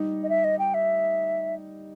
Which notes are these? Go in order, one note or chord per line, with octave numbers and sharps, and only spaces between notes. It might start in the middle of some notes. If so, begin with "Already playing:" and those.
Already playing: G3 D#4
D#5
E5
D#5
G5
E5